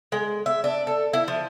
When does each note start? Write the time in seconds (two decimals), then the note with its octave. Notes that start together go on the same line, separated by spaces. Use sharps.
0.12 G#3
0.46 E5
0.64 D4
0.87 A4
1.13 E4
1.28 F3